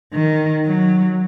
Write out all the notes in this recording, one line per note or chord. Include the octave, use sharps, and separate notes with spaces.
D#3
F#3